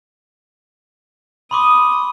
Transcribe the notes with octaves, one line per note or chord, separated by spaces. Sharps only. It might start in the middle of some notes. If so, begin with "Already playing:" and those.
B5 C6 D6 D#6